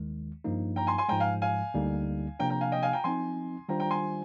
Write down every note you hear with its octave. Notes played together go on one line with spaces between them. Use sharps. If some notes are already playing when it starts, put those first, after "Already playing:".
Already playing: D#2 D#3 G#3
G2 F3 A#3 D#4
G5 A#5
G#5 C6
G#5 C6
G#2 F3 G#3 G5 A#5
F5 G#5
F5 G#5
D2 D3 G3 A#3 D#4
C3 F3 A#3 D4 G5 A#5
G5 A#5
F5 G#5
D#5 G5
F5 G#5
G5 A#5
F3 C4 D#4 G#5 C6
D#3 G3 D4 F4 C5 G5 A#5
G5 A#5
G#5 C6